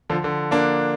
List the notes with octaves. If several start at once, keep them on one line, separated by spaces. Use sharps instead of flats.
D3 F3
D3
A#3 D4